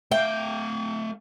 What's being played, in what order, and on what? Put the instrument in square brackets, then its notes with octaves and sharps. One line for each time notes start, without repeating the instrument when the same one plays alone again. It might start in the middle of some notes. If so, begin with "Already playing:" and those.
[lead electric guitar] A3 F5 [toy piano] E5 [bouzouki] G5